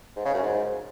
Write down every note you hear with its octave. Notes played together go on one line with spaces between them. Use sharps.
G#2
C#3
F#2
G#2